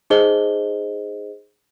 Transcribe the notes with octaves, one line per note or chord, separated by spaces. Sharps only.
D#4 G#4 C5 D#5 G7